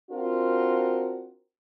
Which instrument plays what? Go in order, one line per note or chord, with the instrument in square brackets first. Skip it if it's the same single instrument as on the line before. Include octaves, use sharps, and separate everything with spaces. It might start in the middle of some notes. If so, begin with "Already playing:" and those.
[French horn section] C4 D4 F4 F#4 A#4